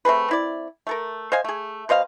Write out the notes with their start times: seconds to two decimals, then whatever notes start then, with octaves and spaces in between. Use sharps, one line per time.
0.05 A3 C4 G#4 B4
0.29 C4 E4 D5
0.87 A3 A4 A#4
1.32 C5 D#5 F5 G#5
1.44 A3 G#4
1.89 B2 C5 D#5 F5